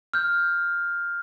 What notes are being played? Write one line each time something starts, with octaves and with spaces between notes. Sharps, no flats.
F6 G6